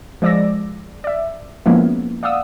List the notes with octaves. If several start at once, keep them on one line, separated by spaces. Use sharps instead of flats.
F3 G#3 D5 D6 E6 A#6
D5 E5
F3 G#3 A#3 B3 C#4 E4
D5 F5 F#5 D#6 E6